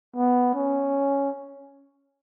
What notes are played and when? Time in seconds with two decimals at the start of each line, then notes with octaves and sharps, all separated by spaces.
0.16 B3
0.54 C#4